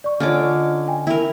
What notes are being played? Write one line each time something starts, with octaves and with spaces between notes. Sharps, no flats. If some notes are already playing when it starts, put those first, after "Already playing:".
D5 C#6
D3 C#4 F4 D#5 D6 F6
G5 G#5
E4 A#4